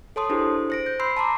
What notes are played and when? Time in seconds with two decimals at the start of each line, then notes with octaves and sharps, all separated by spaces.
0.16 A4 C#5 A5 C6 D#6
0.30 D4 E4 G4 G#4 C5
0.70 C5 A#6 D7
0.86 G6
1.00 B5 C6 E6 G6 C7
1.17 A5 A#5 C6 D6